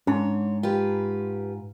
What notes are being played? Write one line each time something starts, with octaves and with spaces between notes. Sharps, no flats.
G#2 C#4 D4 C#5
F4 G4 B4